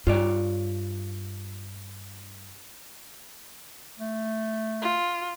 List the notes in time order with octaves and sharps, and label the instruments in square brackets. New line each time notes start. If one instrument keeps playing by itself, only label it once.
[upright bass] G2 [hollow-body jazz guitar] F4 C#5 D5
[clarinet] A3
[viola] F4